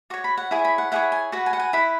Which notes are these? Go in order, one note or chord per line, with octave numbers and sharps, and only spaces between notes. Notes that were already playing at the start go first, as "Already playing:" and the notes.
F#4 C#5 C#6
B5
F#5
E4 G#4 C#5 G#5
B5
F#5
E4 G#4 C#5 F#5
G#5
F#4 B4 F#5
G#5
F#5
G#5
E4 B4 B5